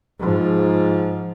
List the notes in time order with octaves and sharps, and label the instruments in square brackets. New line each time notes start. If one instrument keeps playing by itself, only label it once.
[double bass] G#2 F3